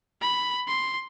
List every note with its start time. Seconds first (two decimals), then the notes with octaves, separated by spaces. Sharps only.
0.21 B5
0.67 C6